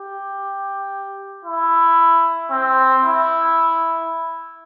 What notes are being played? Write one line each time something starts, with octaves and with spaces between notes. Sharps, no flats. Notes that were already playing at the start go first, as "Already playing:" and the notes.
Already playing: G4
E4
C4
E4